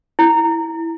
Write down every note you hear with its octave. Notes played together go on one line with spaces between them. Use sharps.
E4